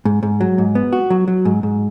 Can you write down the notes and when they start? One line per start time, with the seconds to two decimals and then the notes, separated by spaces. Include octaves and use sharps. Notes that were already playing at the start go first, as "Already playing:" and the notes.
0.05 G#2
0.23 G#2
0.41 F#3
0.58 G#2
0.75 B3
0.93 F#4
1.10 F#3
1.28 F#3
1.45 G#2
1.63 G#2